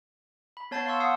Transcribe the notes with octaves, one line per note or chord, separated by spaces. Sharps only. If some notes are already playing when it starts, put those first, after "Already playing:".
B5
B3 C#5 A5 G6 A6 C7
F5 A5 C6 C#6 E6
F5 F#5 C6 D#6 E6